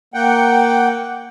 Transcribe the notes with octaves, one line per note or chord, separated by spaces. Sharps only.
A#3 F#5 G5